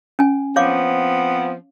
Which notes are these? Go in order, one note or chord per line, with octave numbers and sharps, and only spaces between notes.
C#4 G#5
F3 B3 C4 C#5 F5 D6